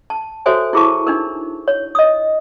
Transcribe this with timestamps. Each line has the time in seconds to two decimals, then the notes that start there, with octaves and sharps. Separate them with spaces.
0.10 A5
0.46 F#4 A4 C5 C#5 E5 G#5
0.73 E4 F4 G#4 A#4 A5 C#6
1.07 D4 D#4 A#4
1.68 C#5
1.95 D#5 D#6